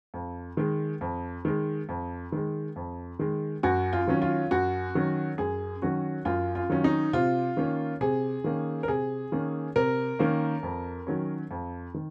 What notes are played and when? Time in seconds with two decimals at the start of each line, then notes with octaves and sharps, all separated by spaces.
0.14 F2
0.57 D#3 G#3
1.01 F2
1.45 D#3 G#3
1.89 F2
2.32 D#3 G#3
2.76 F2
3.19 D#3 G#3
3.63 F#2 F#4
3.93 F4
4.07 D#3 F#3 C#4
4.22 F4
4.51 F#2 F#4
4.95 D#3 F#3 C#4
5.38 F#2 G#4
5.82 D#3 F#3 C#4 F#4
6.25 F#2 F4
6.55 F4
6.70 D#3 F#3 C#4
6.84 D#4
7.13 C3 F4
7.57 D#3 A#3 C#4
8.01 C3 G#4
8.44 D#3 A#3 C#4
8.83 A#4
8.88 C3 G#4
9.32 D#3 A#3 C#4
9.76 C3 A#4
10.19 D#3 A#3 C#4
10.63 F2
11.07 D#3 F#3 C#4
11.51 F2
11.94 D#3